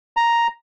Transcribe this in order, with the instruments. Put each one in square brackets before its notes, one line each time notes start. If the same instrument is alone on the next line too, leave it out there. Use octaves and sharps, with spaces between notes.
[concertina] A#5